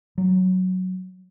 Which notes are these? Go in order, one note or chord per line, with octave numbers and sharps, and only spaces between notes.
F#3